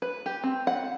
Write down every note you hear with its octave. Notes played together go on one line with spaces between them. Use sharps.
B4
G4
C4
F#5